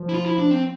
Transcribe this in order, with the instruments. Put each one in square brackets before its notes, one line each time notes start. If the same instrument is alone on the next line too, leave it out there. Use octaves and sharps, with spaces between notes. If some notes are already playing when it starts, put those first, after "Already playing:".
Already playing: [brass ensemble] F3
[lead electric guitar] E4
F4
E4
D4
C4